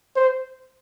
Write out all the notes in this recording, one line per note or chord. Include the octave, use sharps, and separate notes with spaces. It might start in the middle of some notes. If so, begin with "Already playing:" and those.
C5